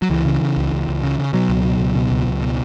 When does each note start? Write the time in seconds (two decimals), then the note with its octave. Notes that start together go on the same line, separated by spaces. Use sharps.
0.02 F#3
0.10 C#2 E3
0.25 C#3
0.41 C#3
0.57 C#2
0.73 C#2
0.88 C#2
1.03 C#3
1.19 C#3
1.33 B2 F#3
1.49 C#2
1.65 B2
1.80 C#2
1.95 B2
2.11 C#2
2.27 C#2
2.42 B2